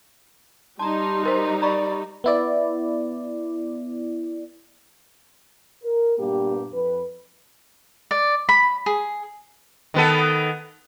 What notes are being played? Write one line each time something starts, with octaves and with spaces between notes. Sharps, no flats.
G3 D#4 A5 A#5 C6
G4 A#4 C5
D5 A#5 B5 C#6
B3 E4 D5
A#4
G2 A#2 A#3 B3 G4
F2 B4
D5
B5
G#4
D#3 B3 A4